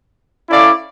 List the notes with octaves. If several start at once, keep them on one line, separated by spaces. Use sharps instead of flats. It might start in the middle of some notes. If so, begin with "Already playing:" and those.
C#4 E4 A4 D5 F5